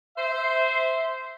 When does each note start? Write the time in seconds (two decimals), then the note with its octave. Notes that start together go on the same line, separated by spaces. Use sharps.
0.17 C5 E5